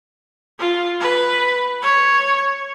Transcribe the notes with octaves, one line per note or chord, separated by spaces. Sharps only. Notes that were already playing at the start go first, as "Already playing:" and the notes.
F4
B4
C#5